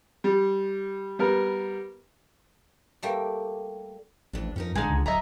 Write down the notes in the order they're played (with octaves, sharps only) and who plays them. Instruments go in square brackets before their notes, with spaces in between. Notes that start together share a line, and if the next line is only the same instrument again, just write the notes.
[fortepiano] G3
G3 B3 A#4
[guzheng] G3 A3 A#3 G4
[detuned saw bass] A1 [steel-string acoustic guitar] F2 D4
[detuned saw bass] F2 [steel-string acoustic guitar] C#4 D#4 A#4
[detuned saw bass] A1 [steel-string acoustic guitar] D3 G#3 [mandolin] D#4 G#4
[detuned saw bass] C#2
[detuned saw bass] D1 [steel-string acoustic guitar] F#3 [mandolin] D#5 E5 A#5